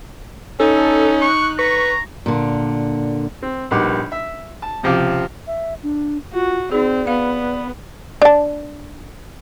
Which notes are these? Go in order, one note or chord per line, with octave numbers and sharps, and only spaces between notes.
C#4 D#4 A4
C#6 F#6
B4 A#5 C#6
A#2 D3
C4
A#1 G3 B3 D#4 F#5 D6
E5
A5
C#2 C3 F3 F5 D6
E5
D4
F4 F#4
C4 D#4 G#4 D5
B3 F5
D4 A5